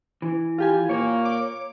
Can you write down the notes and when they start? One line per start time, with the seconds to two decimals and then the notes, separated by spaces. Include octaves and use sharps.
0.22 E3
0.58 F4 G4 G#5
0.89 A#2 A#3 C#5
1.25 D6